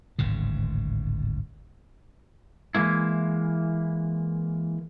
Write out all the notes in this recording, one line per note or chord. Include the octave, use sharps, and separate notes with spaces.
D1 G#1 G#2 C#3
E3 F3 G#3 A#3 E4